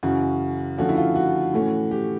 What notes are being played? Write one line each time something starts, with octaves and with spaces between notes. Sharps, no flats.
F#2 C#3 E3 F#4
D3 F3 A3 C#4 F#4
E4
F4
F#4
A2 E3 A3 C#4
G4